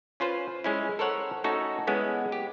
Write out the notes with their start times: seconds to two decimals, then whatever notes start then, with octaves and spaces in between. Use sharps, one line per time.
0.20 C#4 F4 B4 C5
0.64 G#3 C#4 E4
0.99 A4 A#4 C5 C#5 F#5
1.44 A3 C#4 D#4 F#4 A4
1.87 G#3 B3 C#4 E4
2.32 G4